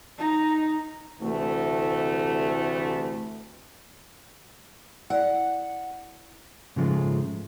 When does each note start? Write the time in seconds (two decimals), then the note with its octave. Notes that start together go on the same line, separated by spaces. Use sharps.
0.18 D#4 A#5
1.21 D2 C3 E3 A3
5.10 E4 D5 F#5
6.76 G#2 C#3 F3 G#3 A3